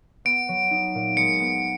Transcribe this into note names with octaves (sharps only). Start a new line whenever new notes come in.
B3 D7
F#3
D#4
A#2
G#3 C#7
B3